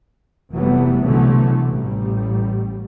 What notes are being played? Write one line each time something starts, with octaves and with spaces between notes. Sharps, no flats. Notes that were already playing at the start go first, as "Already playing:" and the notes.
F1 E3 F#3 G3 A3 B3
C2 B2 D3 E3 F#3 A3
A1 G3